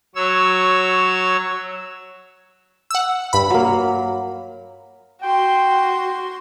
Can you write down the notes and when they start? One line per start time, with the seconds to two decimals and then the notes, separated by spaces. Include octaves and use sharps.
0.15 F#3 C#5 E6
2.91 F#5 E6
3.33 G2 B5
3.50 F#3 A#3
5.22 F#4 G5 C6